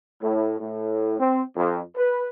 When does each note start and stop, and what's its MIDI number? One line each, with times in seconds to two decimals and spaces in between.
0.23 0.58 45
0.60 1.19 45
1.20 1.42 60
1.56 1.81 41
1.97 2.27 71